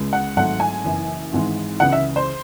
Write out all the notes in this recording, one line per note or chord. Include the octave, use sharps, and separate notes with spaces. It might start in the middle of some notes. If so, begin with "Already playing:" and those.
Already playing: C#2 C#3 G#3
F#5
G#1 G#2 F#3 A3 F#5
G#5
F#1 F#2 E3
G#1 G#2 E3 G#3
C#2 C#3 E3 F#5
E5
C5